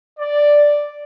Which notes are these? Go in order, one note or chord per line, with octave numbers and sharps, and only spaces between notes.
D5